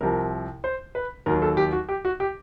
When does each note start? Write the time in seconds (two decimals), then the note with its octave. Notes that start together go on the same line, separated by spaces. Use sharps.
0.01 C2 C3 F3 A#4
0.64 C5
0.95 B4
1.26 D#2 D#3 F#3 A#4
1.42 A4
1.57 G4
1.72 F#4
1.89 G4
2.05 F#4
2.20 G4